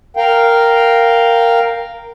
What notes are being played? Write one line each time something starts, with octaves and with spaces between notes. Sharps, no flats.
A#4 F5 G5